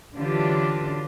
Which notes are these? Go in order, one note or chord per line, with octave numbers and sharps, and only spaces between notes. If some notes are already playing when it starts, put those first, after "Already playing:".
D3 E3 F#3 D4 F4 G4